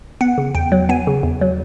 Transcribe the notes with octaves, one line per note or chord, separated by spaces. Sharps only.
B3 F#5
C#3
E2 G5
F#3
B3 G#5
C#3
E2
F#3